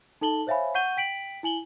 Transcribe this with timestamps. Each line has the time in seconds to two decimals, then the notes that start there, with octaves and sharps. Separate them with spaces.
0.21 D#4 A4 A5 F#7 G7
0.47 C5 C#5 E5 F5 G#5 B5
0.75 F#5 C#6 G6 D#7 G7
0.97 G5 B6 D7 F#7
1.43 E4 G#5 F#7 G7